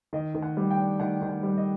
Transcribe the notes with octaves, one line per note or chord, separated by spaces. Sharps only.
D#3 D#5
D#3
F#5
G3
G5
D4
D#3 F#5
D#3
F#5
G3
D#5